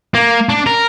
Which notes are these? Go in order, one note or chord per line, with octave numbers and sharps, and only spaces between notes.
A#3
D4
A#4